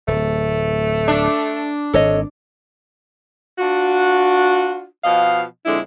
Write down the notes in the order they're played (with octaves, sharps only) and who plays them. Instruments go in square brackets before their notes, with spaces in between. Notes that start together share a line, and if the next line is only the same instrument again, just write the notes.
[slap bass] D1 [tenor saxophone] A3
[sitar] D4
[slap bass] G#1 [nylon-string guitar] A4 C#5 D#5
[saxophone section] D4 F4 F#4
B2 F3 D#5 F5
F2 D3 G#3 D4 E4